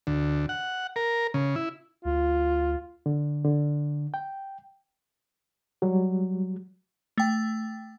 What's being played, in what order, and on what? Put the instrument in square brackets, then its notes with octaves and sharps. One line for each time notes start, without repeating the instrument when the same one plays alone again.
[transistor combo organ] D2
F#5
A#4
C#3
E4
[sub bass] D2 [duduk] F4
[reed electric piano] D3
D3
G5
F#3 G3
[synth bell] A3 G5